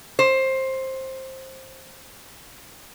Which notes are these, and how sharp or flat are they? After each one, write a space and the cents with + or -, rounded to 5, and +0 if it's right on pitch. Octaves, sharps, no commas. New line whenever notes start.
C5 +15